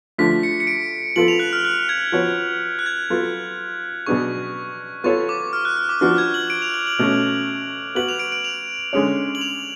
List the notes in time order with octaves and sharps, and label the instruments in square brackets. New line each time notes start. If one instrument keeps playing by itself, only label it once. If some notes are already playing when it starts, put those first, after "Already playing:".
[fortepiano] D3 F3 A3 [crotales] B6
[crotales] C#7
C#7
D7
[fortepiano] F3 B3 F4 A4 [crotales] F#7
[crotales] F7
F#6
F6
F#6
G#6
[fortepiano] F3 B3 F#4 C#5
[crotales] F#6
G#6
[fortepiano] F#3 B3 F4 A4
[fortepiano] B2 F#3 B3 D4 G#4 [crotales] C#6
[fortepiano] B3 F4 A4 C#5 [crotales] C#6
[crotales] D6
F6
F#6
F6
D6
[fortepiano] F3 B3 D4 F#4 [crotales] F6
[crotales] G#6
F#7
D7
F7
F#7
F#7
[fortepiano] B2 A3 C#4
[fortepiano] B3 F#4 B4 [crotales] F#7
[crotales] F7
D7
D7
F7
[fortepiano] D3 G#3 C#4 G#4 C#5
[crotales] F#7
F7